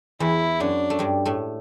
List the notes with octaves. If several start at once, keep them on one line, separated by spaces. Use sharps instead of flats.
E2 E3 E4
F#2 F#3 D4
A3
G2 G3
A2 A3